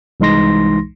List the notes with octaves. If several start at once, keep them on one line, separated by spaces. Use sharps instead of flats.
C2 E3 G#3 D#4 C6 A#6